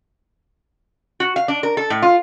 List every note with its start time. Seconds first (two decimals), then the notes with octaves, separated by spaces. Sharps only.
1.20 F#4
1.36 F5
1.48 D4
1.63 A#4
1.77 A4
1.90 A2
2.02 F4